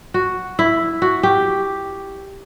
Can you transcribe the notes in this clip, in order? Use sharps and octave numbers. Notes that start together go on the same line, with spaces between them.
F#4
E4
F#4
G4